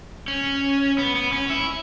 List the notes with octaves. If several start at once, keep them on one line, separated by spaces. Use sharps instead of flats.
C#4
B3
B3
C#4
E4